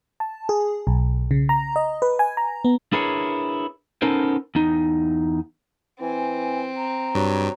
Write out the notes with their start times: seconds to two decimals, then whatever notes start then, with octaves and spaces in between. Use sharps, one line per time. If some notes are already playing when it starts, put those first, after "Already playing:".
0.20 A5
0.49 G#4
0.87 B1
1.31 C#3
1.49 A#5
1.76 D#5
2.02 B4
2.19 G#5
2.37 A#5
2.64 B3
2.93 D4 E4 G#4 A#4 B4 C#5
4.02 B3 C#4 D#4 A4 A#4 C5
4.55 E2 D#4
6.01 E3 C4 G#5
6.76 A#5
7.15 G2 F#3